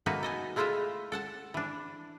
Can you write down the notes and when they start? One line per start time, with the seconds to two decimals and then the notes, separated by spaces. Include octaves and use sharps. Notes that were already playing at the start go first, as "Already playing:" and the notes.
0.06 B2 A3 A#3 D#4 F#4 B4
0.23 A4 D#5 G#5
0.56 G#3 A3 E4 F4 D#5 E5
1.12 A4 F#5 A5
1.54 E3 D4